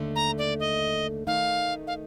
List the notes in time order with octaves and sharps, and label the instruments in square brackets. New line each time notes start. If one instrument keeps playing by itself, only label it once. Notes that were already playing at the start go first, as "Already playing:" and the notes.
Already playing: [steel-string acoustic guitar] D#2 D3 A3
[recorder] A#5
D5
D#5
[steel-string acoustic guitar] D#3 A3 D#4 [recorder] F5
[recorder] F5